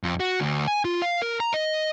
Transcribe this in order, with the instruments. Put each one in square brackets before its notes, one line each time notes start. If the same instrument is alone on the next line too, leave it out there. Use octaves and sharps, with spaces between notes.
[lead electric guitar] F2
F#4
D2
G#5
F4
F5
A#4
A#5
D#5